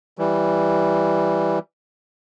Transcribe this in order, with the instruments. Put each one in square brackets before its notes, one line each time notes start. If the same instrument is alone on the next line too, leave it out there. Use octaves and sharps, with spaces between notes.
[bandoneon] E3 G3